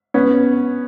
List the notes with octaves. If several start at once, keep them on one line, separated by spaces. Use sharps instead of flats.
B3 C#4